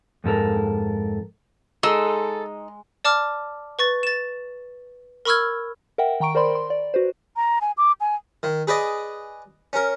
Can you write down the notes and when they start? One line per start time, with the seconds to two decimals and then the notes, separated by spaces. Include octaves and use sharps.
0.24 F2 G#2 A4 A#4
1.83 G#3 D#4 A4 E6
3.04 D5 A5 D6 F6
3.79 B4 C#6 A6
4.03 A6 E7
5.25 A#4 B5 C#6 E6 F6 G#6
5.98 A#4 E5 F#5 G5
6.20 D#3 G5 A#5 C#6 D7
6.35 A#4 C5 D5 B5 C6
6.55 C6
6.70 D5
6.94 F#4 B4 C5
7.36 A#5
7.61 G#5
7.78 D6
8.00 G#5
8.43 D#3
8.67 G#4 B4 D5 D#5
9.73 C#4 A#4